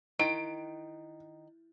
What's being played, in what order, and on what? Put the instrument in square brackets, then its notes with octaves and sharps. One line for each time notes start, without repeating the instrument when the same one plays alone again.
[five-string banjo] D#3 [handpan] E4 [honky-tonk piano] D7